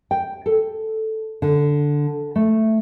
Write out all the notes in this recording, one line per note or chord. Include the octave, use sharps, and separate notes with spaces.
G5
A4
D3
A3